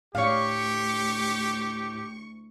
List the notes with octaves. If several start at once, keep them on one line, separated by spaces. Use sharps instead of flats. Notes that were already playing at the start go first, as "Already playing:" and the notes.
D2 A2 G4 C#5 F5 C#6